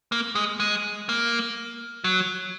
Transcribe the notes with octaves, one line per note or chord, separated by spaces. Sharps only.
A#3
G#3
G#3
A#3
F#3